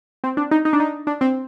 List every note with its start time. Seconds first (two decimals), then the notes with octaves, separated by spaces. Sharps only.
0.24 C4
0.37 D4
0.51 D#4
0.65 D#4
0.73 D4
0.80 D#4
1.07 D4
1.21 C4